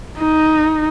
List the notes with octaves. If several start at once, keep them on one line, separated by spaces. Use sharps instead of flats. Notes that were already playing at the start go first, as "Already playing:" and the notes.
D#4